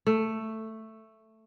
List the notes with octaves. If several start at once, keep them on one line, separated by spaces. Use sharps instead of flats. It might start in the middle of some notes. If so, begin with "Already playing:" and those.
A3